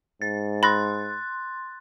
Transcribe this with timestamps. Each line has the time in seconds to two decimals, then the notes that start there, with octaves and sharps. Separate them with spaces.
0.22 G#2 A6
0.63 B5 C6 F#6 A6 A#6